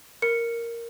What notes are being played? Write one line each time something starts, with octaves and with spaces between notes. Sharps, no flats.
A#4 C#7